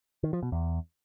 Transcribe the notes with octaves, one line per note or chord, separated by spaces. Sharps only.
D#3
F3
B2
E2